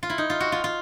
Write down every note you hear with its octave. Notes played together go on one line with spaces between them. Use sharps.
F4
E4
D#4
F4
F#4
F4
F4